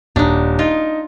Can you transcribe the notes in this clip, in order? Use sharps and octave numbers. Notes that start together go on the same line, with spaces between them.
D#1 D4 D#4
D#4 F4